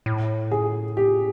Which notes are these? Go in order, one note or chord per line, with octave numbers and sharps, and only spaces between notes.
A2
G#4
G4